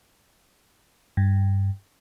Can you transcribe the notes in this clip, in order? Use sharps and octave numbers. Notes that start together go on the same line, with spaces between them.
G2